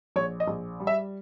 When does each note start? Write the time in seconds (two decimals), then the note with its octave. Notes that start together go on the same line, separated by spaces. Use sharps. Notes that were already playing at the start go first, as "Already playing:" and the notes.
0.16 A#1 C#5
0.40 D#5
0.48 A#1
0.80 G3
0.87 E5